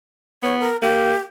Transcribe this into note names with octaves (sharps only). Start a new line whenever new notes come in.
B3 C#5
A#4
A#3 G4